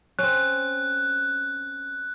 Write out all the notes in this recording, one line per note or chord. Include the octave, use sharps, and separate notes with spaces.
C4 C#4 F#6